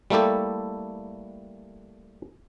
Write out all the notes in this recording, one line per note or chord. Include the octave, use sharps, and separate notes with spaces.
G3 A3 A#3 E4 G4 A4